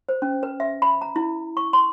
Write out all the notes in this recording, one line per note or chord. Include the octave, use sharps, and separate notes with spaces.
C5
C#4
B4
E5
B5
A#5
E4
C#6
C6